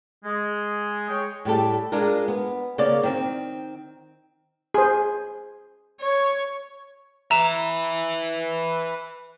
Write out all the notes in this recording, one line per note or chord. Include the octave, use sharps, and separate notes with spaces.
G#3
G#4 C#5 G5
A2 G3 G4 A4
G#3 D4 F4 A#4
B3
C#3 A#3 C#5 D5
D#3 C4
G#4 C5
C#5
B4 E5 A#5 E7